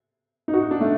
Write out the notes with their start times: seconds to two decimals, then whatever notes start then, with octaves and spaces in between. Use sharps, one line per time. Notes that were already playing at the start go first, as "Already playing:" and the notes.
0.48 D#4
0.53 F#4
0.71 D4
0.81 A3